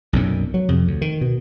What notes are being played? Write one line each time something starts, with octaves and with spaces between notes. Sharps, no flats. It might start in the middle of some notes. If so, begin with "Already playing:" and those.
B1 F#2 A#2
F#3
F2 C3
D2
D#3
B2